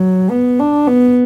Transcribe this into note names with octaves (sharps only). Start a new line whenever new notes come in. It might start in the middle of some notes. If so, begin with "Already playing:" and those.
Already playing: F#3
B3
D4
B3